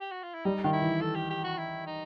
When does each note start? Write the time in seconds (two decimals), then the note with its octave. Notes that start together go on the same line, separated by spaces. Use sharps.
0.01 G4
0.12 F#4
0.23 F4
0.34 E4
0.45 G3 D#4
0.64 D#3 F4
0.73 E4
0.82 E3
1.02 A4
1.15 G4
1.30 G4
1.44 F#4
1.58 E4
1.86 D#4